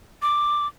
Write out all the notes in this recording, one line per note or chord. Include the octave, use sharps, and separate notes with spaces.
D6